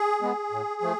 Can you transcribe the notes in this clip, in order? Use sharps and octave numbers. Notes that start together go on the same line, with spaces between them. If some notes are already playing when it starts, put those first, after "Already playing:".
Already playing: G#4
G#3 B3
A2
F3 A3